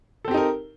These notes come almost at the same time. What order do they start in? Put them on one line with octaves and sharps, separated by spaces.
A4 C4 G4 D#4 A#4